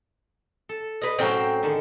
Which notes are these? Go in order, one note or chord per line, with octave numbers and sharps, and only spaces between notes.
A4
B4 D#5
A2 F#3 C4 C#4 G5
D3 D#3 G#4